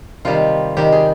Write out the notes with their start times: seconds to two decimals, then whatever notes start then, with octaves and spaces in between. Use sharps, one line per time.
0.25 C3 D#3 G3 F4
0.77 C3 D#3 G3 G4
0.92 G#4